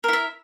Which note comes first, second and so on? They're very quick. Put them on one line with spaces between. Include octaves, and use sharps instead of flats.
A#4 E4 E5